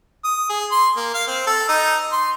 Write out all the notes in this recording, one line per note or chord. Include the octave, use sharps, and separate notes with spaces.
D#6
G#4
C6
A#3
F5
C4
A4
D#4
C6